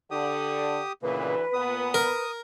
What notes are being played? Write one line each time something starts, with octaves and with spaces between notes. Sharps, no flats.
D3 G4 D#6
D2 A#2 C#3 E3 A#3 B4
A#2 B3 D#6
A#4